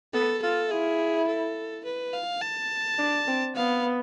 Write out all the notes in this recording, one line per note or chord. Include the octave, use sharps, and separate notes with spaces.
B3 A4
F4 A4
E4 G#4
A4
B4
F5
A5
D4
C4
B3 F5